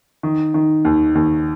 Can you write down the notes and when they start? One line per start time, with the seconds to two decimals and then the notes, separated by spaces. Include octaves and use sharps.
0.23 D#3
0.54 D#3
0.85 D#2
1.15 D#2